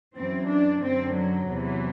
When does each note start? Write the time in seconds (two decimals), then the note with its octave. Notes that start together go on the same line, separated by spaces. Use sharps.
0.16 F#2 E3 C4
0.49 D4
0.82 F#2 D3 C4
1.15 F#3
1.48 E2 C3 E3